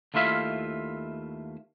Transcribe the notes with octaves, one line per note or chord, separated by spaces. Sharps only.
D#2 A3 E4 F4 E5 F5